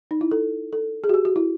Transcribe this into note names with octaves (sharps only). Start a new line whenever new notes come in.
D#4
E4
A4
A4
G#4
F#4
G4
F#4
E4